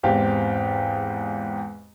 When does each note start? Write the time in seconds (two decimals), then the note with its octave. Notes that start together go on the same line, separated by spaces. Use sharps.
0.03 E2 G#2 C4 G4 F5